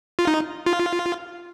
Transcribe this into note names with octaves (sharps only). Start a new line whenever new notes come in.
F4
D#4
F4